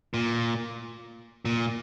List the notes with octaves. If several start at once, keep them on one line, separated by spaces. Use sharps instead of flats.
A#2
A#2